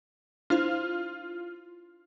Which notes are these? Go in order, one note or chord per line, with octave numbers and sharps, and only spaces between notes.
D4 E4 F4 C5